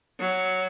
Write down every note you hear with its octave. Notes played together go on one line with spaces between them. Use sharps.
F#3